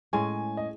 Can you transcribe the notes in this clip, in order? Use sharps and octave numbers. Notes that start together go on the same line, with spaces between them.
A2 G#3 C#4 G#5
D#5